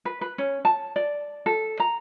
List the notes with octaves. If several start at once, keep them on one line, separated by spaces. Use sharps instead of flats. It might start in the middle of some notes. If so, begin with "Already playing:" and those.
B4
B4
C#4
A5
D5
A4
A#5